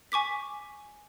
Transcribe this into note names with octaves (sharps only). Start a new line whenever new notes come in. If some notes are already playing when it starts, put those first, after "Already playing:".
G#5 C#6 D6 B6